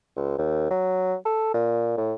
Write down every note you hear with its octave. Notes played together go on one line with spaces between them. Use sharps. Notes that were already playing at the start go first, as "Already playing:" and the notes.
C#2
D#2
F#3
A4
A#2
A2